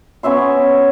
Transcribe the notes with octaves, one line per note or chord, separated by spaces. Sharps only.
B3 C#4 E5 C6